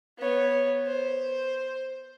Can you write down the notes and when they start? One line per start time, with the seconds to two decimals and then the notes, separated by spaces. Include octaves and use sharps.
0.19 B3 C#5
0.86 C5